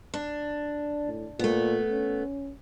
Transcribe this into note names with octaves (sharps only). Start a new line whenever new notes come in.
D4
A2
A#2 A3 B3
C#4